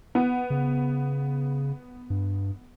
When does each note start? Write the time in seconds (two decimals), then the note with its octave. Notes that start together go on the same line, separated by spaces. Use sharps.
0.15 B3
0.50 C#3
2.10 G2